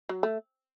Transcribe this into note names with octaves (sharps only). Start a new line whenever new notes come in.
F#3
A3